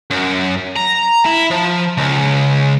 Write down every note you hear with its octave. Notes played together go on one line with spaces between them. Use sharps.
F#2
A#5
E4
F3
C#2